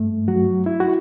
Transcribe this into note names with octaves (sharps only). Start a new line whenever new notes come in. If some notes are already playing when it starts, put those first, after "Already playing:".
Already playing: G2 A3
F#3 F#4
E4
F#4